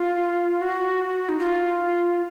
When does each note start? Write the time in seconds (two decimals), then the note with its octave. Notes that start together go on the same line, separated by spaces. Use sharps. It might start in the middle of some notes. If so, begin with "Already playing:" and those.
Already playing: F4
0.61 F#4
1.29 D#4
1.39 F4